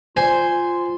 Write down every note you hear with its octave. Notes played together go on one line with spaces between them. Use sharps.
F4 C5 G#5